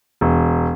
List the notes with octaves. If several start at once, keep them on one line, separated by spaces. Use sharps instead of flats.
E1